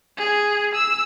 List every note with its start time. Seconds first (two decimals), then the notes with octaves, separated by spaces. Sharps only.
0.17 G#4
0.75 E6